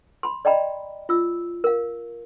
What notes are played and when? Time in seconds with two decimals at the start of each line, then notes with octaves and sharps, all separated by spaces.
0.23 B5 C6
0.45 D5 D#5 G5 A#5 B5
1.09 F4 E6
1.64 A#4 F5